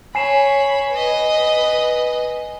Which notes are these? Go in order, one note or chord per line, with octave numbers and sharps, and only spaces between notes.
C#5 G#5 B5 C7 E7
B4 D#5